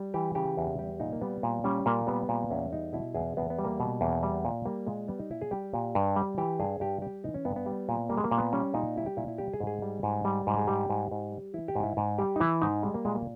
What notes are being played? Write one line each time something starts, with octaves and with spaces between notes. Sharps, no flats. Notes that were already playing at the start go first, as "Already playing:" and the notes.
Already playing: G3
E3 G4
C#3 G4
E2
G3 G4
A#2 D#4
A#3
G3 B3
A#2
G3 C#4
A#2 A#3
G3 B3
A#2
E2 C#4
G3 D#4
B2 E4
E2 G#4
E2 B3
B3
G3
A#3
B2
E2
G3
A#2
G3 A#3
A#2 G#3
G3 B3
D#4
A#2 E4
G#4
G3 G4
A#2
G2
G3
E3 G4
G2 G#4
G2 G4
G3 G4
E3 D#4
C#4
G2 B3
B3
G3
A#2
G3 A#3
G#3
A#3
A#2
B3
G3 C#4
A#2 D#4
G3 E4
G4
A#2 E4
E4
G3 G4
G#4
G#2
G#4
G3
G#2
G3
G#2
G#4
G3 G4
G#2
G#2
G3
E3 E4
G4
G#2
E4
G#2
G3 G4
D#4
E3 E4
G#2 D#4
G3 G#3
A#3
A#2 G#3
A#3